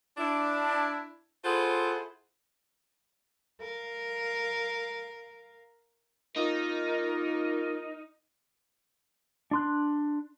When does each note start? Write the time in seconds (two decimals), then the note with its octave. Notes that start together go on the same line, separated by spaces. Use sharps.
0.18 D4 E4
1.44 E4 F4 G#4 A4 C5 F#5
3.60 A#4 F5
6.36 A#3 D#4 F4 A#4
9.51 D4 C6 F#6